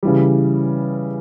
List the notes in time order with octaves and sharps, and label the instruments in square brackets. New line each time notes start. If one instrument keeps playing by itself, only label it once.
[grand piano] C#3 E3 G3